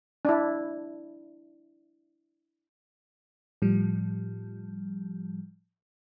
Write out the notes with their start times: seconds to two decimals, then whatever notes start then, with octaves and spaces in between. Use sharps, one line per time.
0.25 D4 E4
3.62 A2 F3 G3